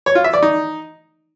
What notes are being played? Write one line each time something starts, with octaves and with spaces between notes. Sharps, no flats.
C#5
F4
E5
D5
D#4